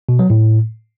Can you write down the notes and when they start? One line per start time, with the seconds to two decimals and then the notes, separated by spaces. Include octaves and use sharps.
0.09 B2
0.19 F#3
0.30 A2